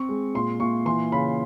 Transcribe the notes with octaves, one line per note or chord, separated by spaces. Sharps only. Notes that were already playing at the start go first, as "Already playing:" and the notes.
Already playing: C4 C#6
G#3
A#2 C6
A#2 C#6
E3 C6
C#3 B5